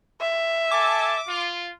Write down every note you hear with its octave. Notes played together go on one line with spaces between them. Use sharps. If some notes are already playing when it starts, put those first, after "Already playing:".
E5
A4 G#5 A5 D6
F4